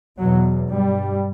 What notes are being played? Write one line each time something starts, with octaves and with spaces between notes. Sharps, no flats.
E2 B2 F#3
G2 G3